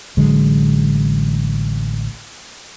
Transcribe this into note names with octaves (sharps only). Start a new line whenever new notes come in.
A1 D3 F#3 G#3